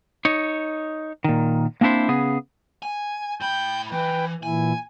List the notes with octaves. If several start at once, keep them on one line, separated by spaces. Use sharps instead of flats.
D#4 C#5
A#2 D#3
A#3 C4 D4 E4 C5
C#3 B3 G#4
G#5
A2 G5 B5 G6
E3 B4 G5
A#2 E3 E4 G#5